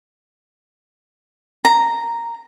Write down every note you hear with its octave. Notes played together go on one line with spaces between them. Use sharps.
A#5